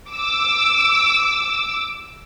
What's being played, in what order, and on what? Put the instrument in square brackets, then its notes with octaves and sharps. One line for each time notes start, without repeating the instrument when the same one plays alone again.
[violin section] D6 E6